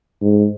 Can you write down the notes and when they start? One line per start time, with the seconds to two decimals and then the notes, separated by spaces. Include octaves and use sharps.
0.22 G#2